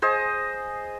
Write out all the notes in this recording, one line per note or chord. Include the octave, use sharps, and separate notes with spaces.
G#4 C5 D#5